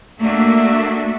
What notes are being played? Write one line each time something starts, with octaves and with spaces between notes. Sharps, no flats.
A3 A#3 D4 F#4 E5